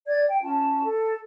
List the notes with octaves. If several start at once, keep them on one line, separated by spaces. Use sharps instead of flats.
D5 G#6
G5
C#4 F4 A5
A4